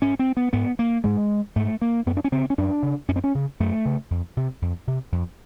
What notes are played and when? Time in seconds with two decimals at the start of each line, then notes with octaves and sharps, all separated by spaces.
0.02 G#2 C#4
0.19 C4
0.37 B3
0.53 G#2 B3
0.79 A#3
1.04 G#2 G#3
1.56 G#2 A3
1.82 A#3
2.06 F#2 B3
2.17 D4
2.24 C#4
2.32 C#3 C4
2.50 C#4
2.58 F#2 D4
2.82 C#3
3.08 F#2 C#4
3.16 C4
3.24 C#4
3.35 C#3
3.60 F#2 A3
3.85 C#3
4.11 F2
4.37 C3
4.62 F2
4.87 C3
5.12 F2